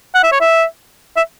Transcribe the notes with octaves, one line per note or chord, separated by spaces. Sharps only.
F#5
E5
C#5
E5
E5